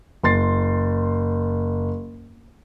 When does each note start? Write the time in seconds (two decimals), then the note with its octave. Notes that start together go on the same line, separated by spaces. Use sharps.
0.23 F#1 C6 A6 C7